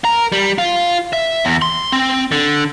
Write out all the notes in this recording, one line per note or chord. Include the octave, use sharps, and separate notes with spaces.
A#4
G3
F4
E5
E2
C6
C4
D3